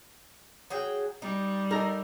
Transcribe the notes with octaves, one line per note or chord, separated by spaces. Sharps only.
F#3 G#4 G5
G3 D#4
D#4 A4 A#4 A#5